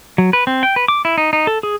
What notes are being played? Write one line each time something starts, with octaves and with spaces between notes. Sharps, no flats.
F#3
B4
C4
G5
B4
D6
E4
D#4
D#4
A4
G#4